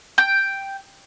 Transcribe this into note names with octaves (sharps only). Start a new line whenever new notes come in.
G5